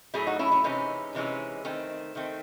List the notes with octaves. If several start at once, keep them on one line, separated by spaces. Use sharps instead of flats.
A2 F#3 A3 E4 G#4
D#4 F#4
C#4 E4
C#4 E4
C3 E3 G#3 C#4 D#4
C3 E3 G#3 C#4
D#3 A3 C4 C#4
D#3 A3 C4